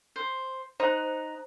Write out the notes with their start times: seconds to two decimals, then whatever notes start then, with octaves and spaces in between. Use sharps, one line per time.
0.16 C5
0.80 D#4 C5 F#6